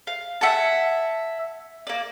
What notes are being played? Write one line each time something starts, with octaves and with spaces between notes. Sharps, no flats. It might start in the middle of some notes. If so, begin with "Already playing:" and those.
F5
E5 F#5 G#5 A5
A#3 D5